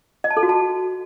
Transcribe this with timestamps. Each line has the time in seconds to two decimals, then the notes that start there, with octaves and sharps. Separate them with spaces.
0.24 D#5
0.30 A5
0.37 A4
0.43 F#4
0.49 A5